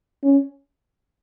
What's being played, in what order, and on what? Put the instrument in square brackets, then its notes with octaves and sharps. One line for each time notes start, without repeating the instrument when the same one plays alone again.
[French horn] C#4